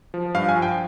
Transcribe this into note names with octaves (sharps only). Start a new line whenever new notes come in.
F3
G2 F5
G#5
F3
G5